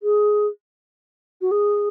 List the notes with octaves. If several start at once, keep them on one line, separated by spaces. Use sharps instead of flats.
G#4
F#4
G#4